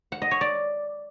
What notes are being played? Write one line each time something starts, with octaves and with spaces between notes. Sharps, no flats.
F#5
D#5
C#5
D5